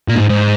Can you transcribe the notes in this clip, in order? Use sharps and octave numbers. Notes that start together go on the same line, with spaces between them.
A#2
F#2
G#2
G#2